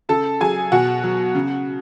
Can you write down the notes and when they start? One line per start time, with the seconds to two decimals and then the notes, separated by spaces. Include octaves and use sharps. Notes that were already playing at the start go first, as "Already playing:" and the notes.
0.09 C#3 A4 A5
0.41 F#3 G#4 G#5
0.72 B2 F#4 F#5
1.04 F#3
1.35 C#3